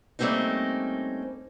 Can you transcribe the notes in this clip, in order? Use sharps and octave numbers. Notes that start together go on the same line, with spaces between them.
G3 A3 A#3 C4 C#4 D#4